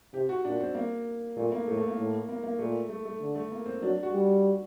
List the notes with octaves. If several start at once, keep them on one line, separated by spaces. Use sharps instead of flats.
C3 G4
F#4
A#2 D4
C4
A#3
A#2 A3
A#3
A2 A3
A3
A#3
A2
A#3
A#3
A#2 A3
A3
A3
D3
A3
A#3
C4
F#3 D4
F#4
G3